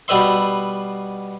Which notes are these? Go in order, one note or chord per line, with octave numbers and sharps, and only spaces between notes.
B2 G3 B4 E5 C6